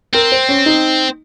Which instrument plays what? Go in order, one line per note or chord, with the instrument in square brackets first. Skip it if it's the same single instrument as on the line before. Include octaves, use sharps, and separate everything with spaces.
[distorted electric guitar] C4 [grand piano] A#4
[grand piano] C5
C#4
D#4